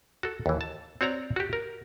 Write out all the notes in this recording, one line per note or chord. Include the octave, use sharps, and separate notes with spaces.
F#4 A4
D#2 E3
A5
C4 F#4 C#5 D5 A#5
F#4 G4
A#4